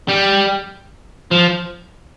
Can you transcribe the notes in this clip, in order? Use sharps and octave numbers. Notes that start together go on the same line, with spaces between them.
G3
F3